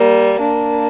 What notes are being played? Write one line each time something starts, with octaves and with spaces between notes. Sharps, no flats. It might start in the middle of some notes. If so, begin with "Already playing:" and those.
Already playing: G3 A#3
A#3 D4